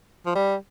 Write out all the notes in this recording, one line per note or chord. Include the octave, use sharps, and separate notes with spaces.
F3
G3